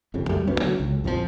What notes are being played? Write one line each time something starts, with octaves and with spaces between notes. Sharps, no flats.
G1 F2 C#3
F#2 G3 A3
D2 B3 C#4
D3 F#3
C#2
A#1 F2 E3 F3